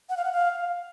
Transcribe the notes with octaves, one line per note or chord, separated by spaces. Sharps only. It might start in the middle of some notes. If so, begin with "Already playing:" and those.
F#5
F5
F#5
F5